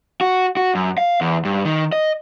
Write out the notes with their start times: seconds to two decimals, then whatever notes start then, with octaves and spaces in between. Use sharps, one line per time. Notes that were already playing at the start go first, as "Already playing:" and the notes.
0.21 F#4
0.57 F#4
0.75 F#2
0.98 F5
1.21 E2
1.45 G2
1.65 D#3
1.92 D#5